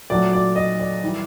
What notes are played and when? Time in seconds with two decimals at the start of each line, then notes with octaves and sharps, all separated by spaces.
0.10 A#2 F#3 A3 D5
0.33 D5
0.56 D#5
0.80 D5
1.03 E3 G3